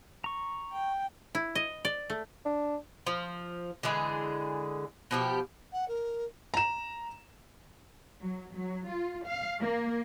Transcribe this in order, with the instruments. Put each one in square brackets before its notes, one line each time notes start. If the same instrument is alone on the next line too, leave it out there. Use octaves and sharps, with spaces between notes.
[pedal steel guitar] A#5 C#6
[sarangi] G5
[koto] E4
D#5
D5
A3
[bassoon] D4
[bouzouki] F3
D3 E3 G#3 G#4
B2 F3 G4
[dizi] F#5
A#4
[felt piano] A#5 E7
[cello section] F#3
F#3
F4
F5
A#3